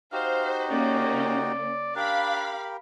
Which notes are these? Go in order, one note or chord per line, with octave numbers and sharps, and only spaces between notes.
D#4 F#4 G4 C5 F5
C#3 A#3 C#4 D5
D4 G4 A#4 F5 B5